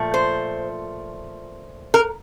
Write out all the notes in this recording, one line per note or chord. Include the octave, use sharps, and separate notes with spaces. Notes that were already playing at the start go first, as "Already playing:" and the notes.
Already playing: A#2 F3 A3
C5
A#4